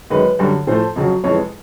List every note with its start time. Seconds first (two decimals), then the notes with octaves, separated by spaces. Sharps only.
0.10 F#2 D#3 G#3 B4
0.39 F#2 D3 G3
0.67 A2 F3 A3 C5
0.96 F2 C#3 F#3
1.24 F2 C3 E3 G#3 C#5